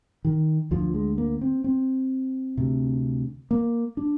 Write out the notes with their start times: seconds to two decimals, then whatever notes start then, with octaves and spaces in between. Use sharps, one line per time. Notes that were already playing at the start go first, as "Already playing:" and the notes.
0.25 D#3
0.71 D2 D3 F3
0.94 G#3
1.18 A#3
1.41 C4
1.64 C4
2.57 D2 C3
3.51 A#3
3.97 D4